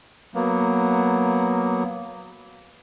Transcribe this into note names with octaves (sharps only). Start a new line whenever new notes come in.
F#3 A#3 B3